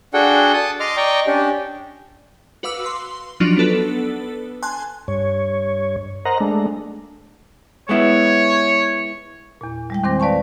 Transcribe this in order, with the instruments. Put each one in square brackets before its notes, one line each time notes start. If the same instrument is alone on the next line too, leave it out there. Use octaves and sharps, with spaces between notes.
[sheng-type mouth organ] D4 F#4 G#4 A4 F#5 G5
A5 D#6
D#5 C6 D6 F6
D5 D#5 G5 A#5 C#6
C#4 D4 G4
[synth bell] F#4 B4 F5 D6 E6
C6
F3 F#3 D4 D#4 F4 F#4
B3 D4 A4 B4
G#5 A5 C6 F#6
[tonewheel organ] G2 C#5
A#4 C5 D#5 F#5 A#5
G#3 A3 D4
[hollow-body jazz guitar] G#3 B3 E4 [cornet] C#5
[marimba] E2 A#2
G3 G#3 G5
E2 D#3 C4 C5 D6 A#6
B4 D5 F5 A5 C#6